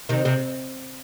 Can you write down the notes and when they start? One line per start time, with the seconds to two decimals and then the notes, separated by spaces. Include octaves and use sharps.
0.09 C3 D#3
0.25 C3